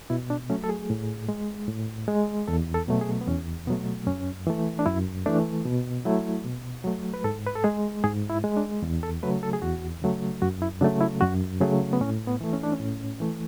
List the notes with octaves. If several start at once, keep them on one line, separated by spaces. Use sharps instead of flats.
B2 E4
D4
F#3 A3 C#4
A4
G#4
A2
G#3
A2
G#3
E2 A4
A4
B2 F#3 A3
G#4
B3
E2 C#4
B2 F#3 A3 B3
F#2 C#4
E3 A3
D4
F#2 E4
E3 A3 D4
B2
F#3 A3 E4
B2
F#3 A3
B4
G#2 A4
B4
A4
G#3 G#4
G#2 G#4
E4
G#3
D4
E2
A4
C#3 F#3 A3 B4
A4
G#4
E2 F#4
C#3 F#3 A3
F#2 F#4
E4
C#3 F#3 A3 D4
E4
F#2 F#4
C#3 F#3 A3 G#4
B3
A2 C#4
B3
E3 A3
C#4
D4
C#4
A2
E3 A3